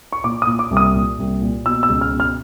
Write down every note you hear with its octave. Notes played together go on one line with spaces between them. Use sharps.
C#6
A#2 D6
D#6
A#2
D6
C2
D#6
A#2
C2
A#2
B2 E6
E6
C#2
F6
B2
F6